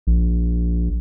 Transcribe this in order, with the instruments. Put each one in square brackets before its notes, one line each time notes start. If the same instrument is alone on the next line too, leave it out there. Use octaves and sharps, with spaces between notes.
[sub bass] A#1